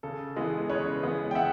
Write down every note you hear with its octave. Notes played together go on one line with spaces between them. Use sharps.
C#3 A4
E3 G#3 B3
C#3 B4 C#5
E3 G#3 B3
G5
C#3 E5 F#5